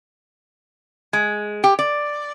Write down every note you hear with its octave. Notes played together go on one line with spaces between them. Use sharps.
G#3
G4
D5